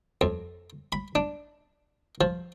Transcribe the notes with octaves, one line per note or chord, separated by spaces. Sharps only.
F2
B5
D4
F3